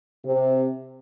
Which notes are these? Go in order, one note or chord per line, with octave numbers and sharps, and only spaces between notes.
C3